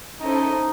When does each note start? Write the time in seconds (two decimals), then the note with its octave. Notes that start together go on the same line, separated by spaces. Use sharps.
0.20 C#4 D#4 E4 A4 C5 D#5